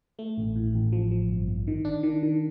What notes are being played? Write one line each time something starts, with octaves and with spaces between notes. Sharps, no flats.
A3
A1
A2
A1
F3
F3
G1
G1
D#3
D4
D#3
D#3